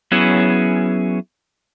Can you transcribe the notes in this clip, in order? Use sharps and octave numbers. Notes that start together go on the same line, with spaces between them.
F#3 B3 C#4 E4 G#4